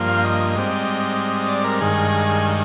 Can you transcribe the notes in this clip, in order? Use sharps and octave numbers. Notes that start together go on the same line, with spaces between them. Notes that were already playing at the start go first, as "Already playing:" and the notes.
Already playing: G2 F3 A#3
F5
D#5
G#2 G3 C4
D5
A#4
G2 D#3 G#3 G#4